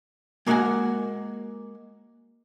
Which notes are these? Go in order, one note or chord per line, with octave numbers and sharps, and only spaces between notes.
G#3 A#3 B3 F#4 F#5 G#5